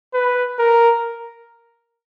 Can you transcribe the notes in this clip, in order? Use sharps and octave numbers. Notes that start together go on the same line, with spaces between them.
B4
A#4